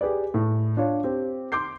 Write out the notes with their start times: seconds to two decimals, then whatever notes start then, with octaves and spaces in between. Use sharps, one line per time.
0.01 G4 G#4 B4 D5
0.34 A2
0.77 D4 F4 C#5
1.04 C4 G4
1.52 C6 D6 G6 C7